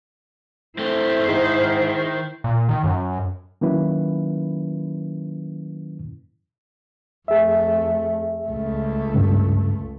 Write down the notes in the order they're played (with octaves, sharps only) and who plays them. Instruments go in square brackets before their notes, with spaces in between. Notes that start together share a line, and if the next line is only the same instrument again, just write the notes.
[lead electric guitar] A3 C4 [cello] E4 C5
[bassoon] G#2 [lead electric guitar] D#3
[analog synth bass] A#2
D#3
F#2
[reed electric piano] D#3 F#3 A#3 C#4 E4 B4
[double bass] F2 A3 [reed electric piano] G#4 E5
[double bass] C#2 A3
[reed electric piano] G2 C#3